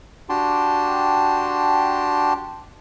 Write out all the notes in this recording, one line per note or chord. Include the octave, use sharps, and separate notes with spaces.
D4 F#4 G4 G5 A5 C6